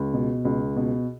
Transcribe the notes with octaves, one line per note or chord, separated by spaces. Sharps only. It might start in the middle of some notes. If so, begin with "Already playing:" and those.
Already playing: C#2
B2
C#2
B2